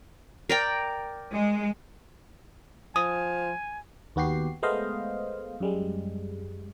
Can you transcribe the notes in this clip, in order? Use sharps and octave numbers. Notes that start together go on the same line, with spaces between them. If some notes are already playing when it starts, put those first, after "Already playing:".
A#4 D5 G5
G#3
F3 G#5 D#6
D#2 B3 F#4 G4 C7
G#3 A3 B3 C5 D#5 F5
F#2 G3 G#3